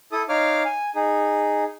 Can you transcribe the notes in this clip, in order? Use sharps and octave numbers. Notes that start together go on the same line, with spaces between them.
E4 A4 D#6
D#4 C#5 F5 D6 F6
G#5
D#4 G#4